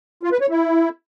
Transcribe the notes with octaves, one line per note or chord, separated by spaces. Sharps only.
F4
B4
C#5
E4